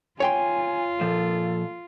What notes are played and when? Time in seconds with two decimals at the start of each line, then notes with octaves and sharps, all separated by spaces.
0.20 F4 C#5 G5 G#5 C6
1.01 A#2 F3 A4